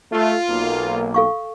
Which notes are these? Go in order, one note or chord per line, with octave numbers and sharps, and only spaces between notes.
A3 F4
B1 A#3
A4 F5 C#6